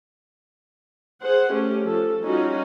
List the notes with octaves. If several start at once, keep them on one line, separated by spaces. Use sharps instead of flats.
G#4 C5 F#5
A3 C#4 G4
F3 A4
G3 C#4 D#4 F4 F#4